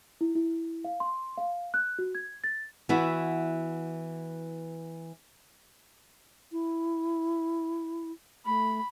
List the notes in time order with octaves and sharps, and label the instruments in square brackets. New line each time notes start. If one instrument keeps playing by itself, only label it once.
[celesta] E4
E4
F5
C6
F5
F#6
F#4
G#6
A6
[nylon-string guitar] E3 B3 E4 F#4
[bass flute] E4
[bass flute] A3 [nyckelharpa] B5